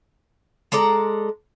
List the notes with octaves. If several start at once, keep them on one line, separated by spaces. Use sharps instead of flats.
G#3 A4 D5 A#5